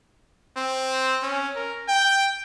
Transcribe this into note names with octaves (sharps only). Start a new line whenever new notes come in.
C4
C#4
A#4
G5